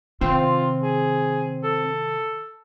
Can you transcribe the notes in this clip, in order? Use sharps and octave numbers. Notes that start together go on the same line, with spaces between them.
C3 D#3 C4 F4
G#4
A4